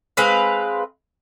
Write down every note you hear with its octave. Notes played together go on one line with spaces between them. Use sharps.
G#3 C4 B4 F5